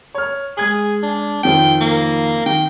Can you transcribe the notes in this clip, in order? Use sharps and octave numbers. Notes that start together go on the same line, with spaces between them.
C#5 F6
G#3 G#4 G#6 F#7
D4
F2 D#3 F3 G5
A#3
D#3 G5